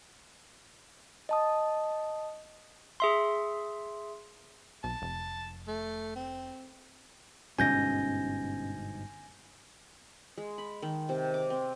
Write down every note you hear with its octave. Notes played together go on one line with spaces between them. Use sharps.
D#5 A5 D#6
G#4 E5 C6
B1 A5
F1
A3
C4
G1 G#2 B2 C#4 G#5 G6 A#6
G#3
B5
D#3
C3
D6
C4